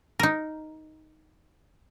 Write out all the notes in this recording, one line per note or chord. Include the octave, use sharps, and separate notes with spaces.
D#4 A#4